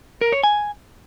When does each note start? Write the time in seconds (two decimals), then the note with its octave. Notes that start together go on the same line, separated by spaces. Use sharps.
0.21 A#4
0.32 C#5
0.43 G#5